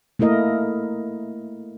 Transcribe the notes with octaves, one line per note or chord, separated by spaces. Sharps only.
A3 A#3 E4 A#4 D#5